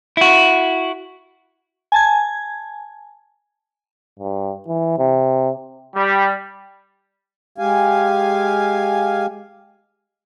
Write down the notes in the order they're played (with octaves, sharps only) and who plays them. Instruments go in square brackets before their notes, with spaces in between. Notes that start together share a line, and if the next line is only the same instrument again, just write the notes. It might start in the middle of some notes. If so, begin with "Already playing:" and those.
[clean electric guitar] E4 F#4
[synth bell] G#5 A5 G#6
[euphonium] G2
E3
C3
[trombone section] G3
[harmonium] G#3 G4 F5 G#5